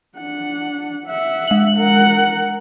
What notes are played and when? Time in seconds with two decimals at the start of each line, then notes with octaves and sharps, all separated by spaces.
0.17 D4 F#5
1.07 E5 F#5
1.47 G#3 F#7
1.76 A#4 F#5